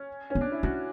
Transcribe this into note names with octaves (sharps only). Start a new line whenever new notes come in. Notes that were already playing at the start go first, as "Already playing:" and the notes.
Already playing: C#4
C#4
B3
D4
E4
C#4 F#4